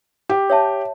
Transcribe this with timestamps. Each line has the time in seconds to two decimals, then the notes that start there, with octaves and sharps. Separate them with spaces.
0.29 G4
0.50 C#5 E5 A5